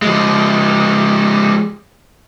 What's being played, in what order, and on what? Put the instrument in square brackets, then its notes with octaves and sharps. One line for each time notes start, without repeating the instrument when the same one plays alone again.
[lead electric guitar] F3 G#3